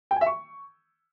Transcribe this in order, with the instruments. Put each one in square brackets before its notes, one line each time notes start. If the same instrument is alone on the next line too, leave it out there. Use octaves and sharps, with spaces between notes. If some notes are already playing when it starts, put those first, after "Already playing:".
[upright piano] G5
G#5
E5
C#6